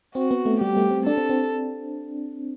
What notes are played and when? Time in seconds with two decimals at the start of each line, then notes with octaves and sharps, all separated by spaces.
0.15 C4 F#4
0.31 B3
0.45 A3
0.61 G3 G4
0.77 A3
0.91 C4
1.06 D4 A4
1.17 C4
1.30 C4